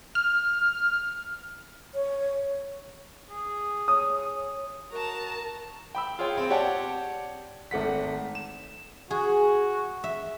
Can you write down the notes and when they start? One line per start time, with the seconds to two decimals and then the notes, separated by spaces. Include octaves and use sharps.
0.15 F6
1.94 C#5
3.30 G#4
3.88 C#5 D#6
4.92 F#4 A#4 A5 A#5
5.95 G5 B5 E6
6.19 F4 G#4 C#5 G5
6.37 C4
6.50 G4 C#5 D5 F#5 G5 A5
7.71 G#1 A3 F#5 B6
8.35 E7
9.11 F#4 G#4
10.04 E5